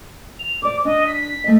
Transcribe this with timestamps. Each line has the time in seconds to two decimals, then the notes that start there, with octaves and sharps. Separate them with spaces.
0.39 F7
0.62 C5 D5 D6
0.85 D4 D#5
1.07 B6
1.44 A3 D#5